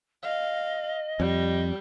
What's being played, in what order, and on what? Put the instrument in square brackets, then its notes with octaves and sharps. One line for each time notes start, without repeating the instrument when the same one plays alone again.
[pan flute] D#5 [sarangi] F5
[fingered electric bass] F2 [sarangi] G3